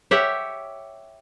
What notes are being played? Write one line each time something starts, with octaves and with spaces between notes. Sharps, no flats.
G4 C#5 E5 F#5